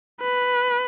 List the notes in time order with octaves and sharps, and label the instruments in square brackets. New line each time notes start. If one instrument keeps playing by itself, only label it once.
[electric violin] B4